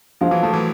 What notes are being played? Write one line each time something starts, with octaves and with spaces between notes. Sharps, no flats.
F3 F#3 G#3
E3 F#3
F3 A3
E3 F#3